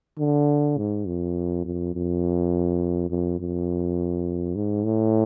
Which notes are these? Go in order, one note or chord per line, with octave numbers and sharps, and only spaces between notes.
D3
G#2
F2
F2
F2
F2
F2
G#2
A2